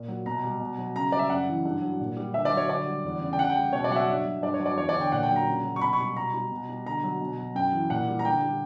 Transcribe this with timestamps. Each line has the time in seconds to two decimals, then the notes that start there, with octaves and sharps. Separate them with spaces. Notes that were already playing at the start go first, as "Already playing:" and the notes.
Already playing: A#2
0.08 F#3
0.26 B2 A#5
0.44 G3
0.60 B2
0.78 F#3
0.96 C#3 A#5
1.12 G3 D5
1.19 E5
1.30 F#2 F#5
1.48 E3
1.65 G2
1.82 F#3
2.00 A#2
2.16 G3
2.34 D3 E5
2.45 D5
2.52 F#3
2.57 C#5
2.68 D3 D5
2.86 G3
3.04 E2
3.21 C#3
3.33 G5
3.39 C#3 F#5
3.50 G5
3.56 G3
3.73 B2 C#5
3.84 D5
3.91 F#3 F#5
3.96 E5
4.08 G2
4.25 F#3
4.42 G2 D5
4.54 C#5
4.60 F#3
4.66 D5
4.77 E2 C#5
4.89 D5
4.95 D3
5.01 G5
5.12 A#2 F#5
5.23 G5
5.30 F#3
5.36 A#5
5.47 C#3
5.64 F#3
5.76 C#6
5.81 B2 B5
5.93 C#6
5.99 G3
6.16 B2 A#5
6.34 G3
6.51 B2
6.69 G3
6.85 D3 A#5
7.03 F#3
7.21 B2
7.38 F#3
7.55 F#2 G5
7.73 E3
7.90 A#2 F#5
8.08 G3
8.19 A#5
8.25 D3 G5
8.42 G3